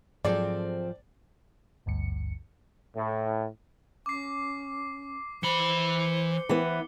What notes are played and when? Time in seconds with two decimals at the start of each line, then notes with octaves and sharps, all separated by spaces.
0.25 G#2 F3 F#3 C4 G#4 A4 D5
1.86 G#1 D2 G2 C#7
2.96 A2
4.06 C#4 D6 C7
5.43 E3 C5 B5 C#7 G7
6.49 E3 B3